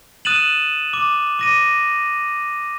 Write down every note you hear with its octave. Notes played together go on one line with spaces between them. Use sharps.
D#6 F#6 A6 D#7 E7 F#7
D6
D6 A#6 D#7